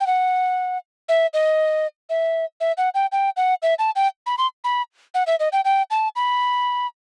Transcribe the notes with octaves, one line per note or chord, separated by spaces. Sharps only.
G5
F#5
E5
D#5
E5
E5
F#5
G5
G5
F#5
E5
A5
G5
B5
C6
B5
F#5
E5
D#5
G5
G5
A5
B5